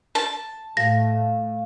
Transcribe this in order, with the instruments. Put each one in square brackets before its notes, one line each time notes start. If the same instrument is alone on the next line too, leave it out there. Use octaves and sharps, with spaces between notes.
[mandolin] A5
[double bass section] A2 A3 [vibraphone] F5 [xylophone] A#6